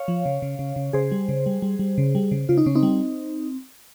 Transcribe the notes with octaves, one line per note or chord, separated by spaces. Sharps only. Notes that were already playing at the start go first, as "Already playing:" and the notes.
Already playing: C#5 F5
F3
C#3
C#3
C#3
C#3
C#3 G#4 C5
G3
C#3
G3
G3
G3
C#3
G3
C#3
C#3 F4
D#4
C#3 C#4
C4 D#4
G3